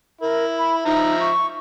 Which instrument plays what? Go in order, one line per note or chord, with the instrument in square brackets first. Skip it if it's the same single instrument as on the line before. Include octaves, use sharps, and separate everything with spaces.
[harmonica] E4 [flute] A#4
[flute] B5
[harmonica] F3 E5 A#5 [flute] D#4
[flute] C#6